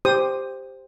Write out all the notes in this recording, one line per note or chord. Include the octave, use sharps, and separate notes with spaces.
G4 C5 D#6